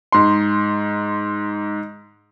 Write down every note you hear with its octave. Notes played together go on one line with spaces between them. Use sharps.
G#2 C6